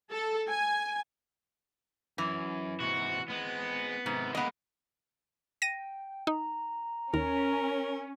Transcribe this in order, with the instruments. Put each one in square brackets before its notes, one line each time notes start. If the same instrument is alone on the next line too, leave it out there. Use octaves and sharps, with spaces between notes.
[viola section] A4
G#5
[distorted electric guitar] F#2 [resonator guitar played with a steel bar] E3
[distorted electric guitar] G#2 C3 [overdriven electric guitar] F#4
[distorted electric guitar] G#3 C4 [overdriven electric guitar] B3
[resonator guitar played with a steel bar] G#2 [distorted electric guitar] C3 D#3
[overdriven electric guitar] G#3 A#3 [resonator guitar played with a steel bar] B3 D#5
[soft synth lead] G5 [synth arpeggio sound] A#6 D#7
[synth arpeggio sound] D#4 [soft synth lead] A#5
[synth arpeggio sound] D#2 [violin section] C#4 [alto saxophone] A#4